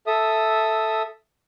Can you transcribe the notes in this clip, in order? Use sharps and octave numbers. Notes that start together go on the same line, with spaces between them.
A4 E5 D#6